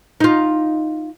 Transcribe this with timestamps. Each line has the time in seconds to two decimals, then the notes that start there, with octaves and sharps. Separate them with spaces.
0.20 D#4 F4